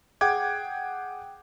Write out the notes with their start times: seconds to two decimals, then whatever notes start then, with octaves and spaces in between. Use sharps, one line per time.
0.21 G#4 F#5 G5 D6 G#6